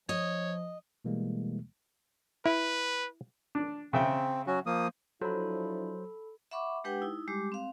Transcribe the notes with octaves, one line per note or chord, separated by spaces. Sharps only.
F3 C#5 D#5
B2 E3 G3 G#3 A#3
E4 B4
D4
C#3 C4 E5 G5
F#3 C#4 F#4
F3 A#3 D#6
F3 F#3 D4 E4 A4 C5 B5
E5 F#5 B5 C#6 D6
G#3 D4 G4 B4 F#5 G5
D#4 E4
G3 G#3 G4 D6
C4 F5